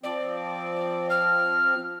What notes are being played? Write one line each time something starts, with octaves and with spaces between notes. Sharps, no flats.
F3 C4 D5
F6